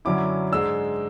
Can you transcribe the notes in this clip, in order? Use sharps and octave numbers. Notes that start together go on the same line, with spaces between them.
F#2 D3 F#3 C#4 E4 D6
G#2 G#3 D4 E6